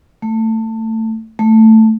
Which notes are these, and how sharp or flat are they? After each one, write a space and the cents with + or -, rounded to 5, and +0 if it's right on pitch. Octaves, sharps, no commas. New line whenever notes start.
A3 +20
A3 +10